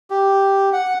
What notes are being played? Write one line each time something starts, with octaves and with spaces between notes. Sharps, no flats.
G4
F#5